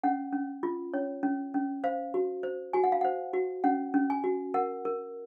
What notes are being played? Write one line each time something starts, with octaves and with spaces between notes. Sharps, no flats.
C#4 F#5
C#4
F4
C#4 C#5
C#4
C#4
C5 F5
F#4
C5
F#4 G#5
F#5
F5
C5 F#5
F#4
C#4 F#5
C#4
G#5
F#4
A#4 F#5
A#4